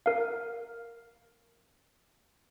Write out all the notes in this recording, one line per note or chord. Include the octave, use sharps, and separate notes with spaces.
A#4 F5